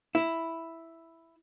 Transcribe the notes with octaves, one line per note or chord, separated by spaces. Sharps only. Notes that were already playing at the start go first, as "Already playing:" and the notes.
E4